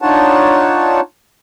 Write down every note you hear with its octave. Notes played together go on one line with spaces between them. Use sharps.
D4 D#4 F4 C#5 F#5 A5